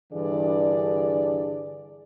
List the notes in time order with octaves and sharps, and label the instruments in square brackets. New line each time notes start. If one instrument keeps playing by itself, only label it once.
[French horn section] G2 D3 E3 D4 G#4 D5